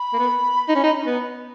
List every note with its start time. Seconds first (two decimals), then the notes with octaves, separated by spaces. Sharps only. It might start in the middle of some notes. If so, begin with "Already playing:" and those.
Already playing: B5
0.13 A#3
0.19 B3
0.69 D#4
0.75 C#4
0.83 D#4
1.07 B3